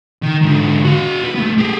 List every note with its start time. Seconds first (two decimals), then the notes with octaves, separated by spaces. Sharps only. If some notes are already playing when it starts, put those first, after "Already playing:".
0.23 D#3
0.42 G#2 D3
0.85 F#4 F5
1.24 B4
1.35 A3 B3
1.58 G4 G#4